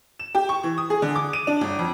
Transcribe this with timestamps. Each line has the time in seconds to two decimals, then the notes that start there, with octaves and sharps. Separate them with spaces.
0.20 E7
0.35 G4
0.49 C#6
0.63 E3
0.78 D#6
0.90 G#4
1.02 D3
1.15 D6
1.33 D#7
1.47 D4
1.61 G1
1.79 F2